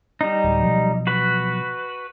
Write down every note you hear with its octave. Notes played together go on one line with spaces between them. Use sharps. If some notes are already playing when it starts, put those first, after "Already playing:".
G3 D#4
D1
B2 F3 F#3
F#4 B4